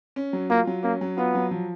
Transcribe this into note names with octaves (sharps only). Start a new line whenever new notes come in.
C#4
F#3
A#3 F4
F#3
A#3 C#4
F#3
B3 F4
F#3
F3